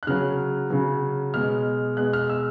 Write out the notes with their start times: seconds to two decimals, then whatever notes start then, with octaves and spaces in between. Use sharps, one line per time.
0.03 F#6
0.07 C#3 F#3 F6
0.70 C#3 F#3
1.34 B2 G#3 F6
1.97 B2 G#3 F#6
2.13 F6
2.29 E6